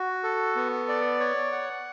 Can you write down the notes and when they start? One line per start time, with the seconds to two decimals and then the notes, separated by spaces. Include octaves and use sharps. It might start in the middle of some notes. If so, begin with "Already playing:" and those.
Already playing: F#4
0.24 A4
0.56 B3
0.88 D5
1.20 C#5
1.52 F#5